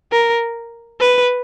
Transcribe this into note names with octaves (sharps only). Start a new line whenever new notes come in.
A#4
B4